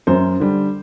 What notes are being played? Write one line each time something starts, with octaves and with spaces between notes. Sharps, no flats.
F#2 C5
D3 G3